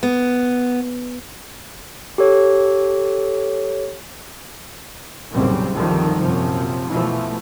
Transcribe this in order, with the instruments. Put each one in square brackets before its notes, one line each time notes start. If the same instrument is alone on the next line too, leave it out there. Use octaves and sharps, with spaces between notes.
[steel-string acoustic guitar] B3
[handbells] G4 A4 C#5
[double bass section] F#1 B1 F#2 A#2 G3 C4
C2 G2 D3 D#3 F3 G3
A#1 F#2 C3 F3
B2 E3 F3 A3